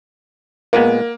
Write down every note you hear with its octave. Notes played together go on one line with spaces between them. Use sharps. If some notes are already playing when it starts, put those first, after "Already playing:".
A#2 G#3 A#3 B3